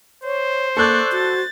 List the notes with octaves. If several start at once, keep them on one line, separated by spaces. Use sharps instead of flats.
C5 C#5
A#3 A4 D5 C#6 F#6 G6
F#4 A6